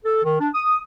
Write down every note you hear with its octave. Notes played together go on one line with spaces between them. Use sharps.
A4
D#3
D4
D#6